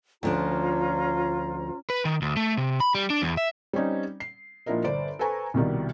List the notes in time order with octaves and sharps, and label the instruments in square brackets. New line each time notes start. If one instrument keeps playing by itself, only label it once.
[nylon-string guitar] D2 F3 D4 [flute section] C#4 F4 A#5
[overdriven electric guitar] B4
D#3
D2
A3
C3
B5
G3
D4
E2
E5
[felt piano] G3 C4 C#4 D#4
C7
A#2 F3 D4 E4 A#4 D#5
G1 C5 D5 D7
A4 B4 C5 G#5 A#5 C#6
C2 B2 D#3 G3